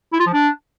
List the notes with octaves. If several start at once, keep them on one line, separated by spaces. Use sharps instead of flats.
E4
F4
F3
D4